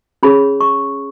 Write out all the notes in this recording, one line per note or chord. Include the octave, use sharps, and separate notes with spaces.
C#4 G#4 C#5 B5
C#6